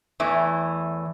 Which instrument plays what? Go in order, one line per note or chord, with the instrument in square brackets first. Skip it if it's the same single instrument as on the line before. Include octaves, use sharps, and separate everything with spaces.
[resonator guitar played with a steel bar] E2 A2 E3